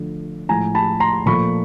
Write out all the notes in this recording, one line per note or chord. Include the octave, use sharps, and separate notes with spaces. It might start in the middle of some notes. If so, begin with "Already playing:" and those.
Already playing: D3 F3 A3
A2 F3 G#3 G#5 A#5
A5 B5
A#5 C6
A#2 F3 A3 B5 C#6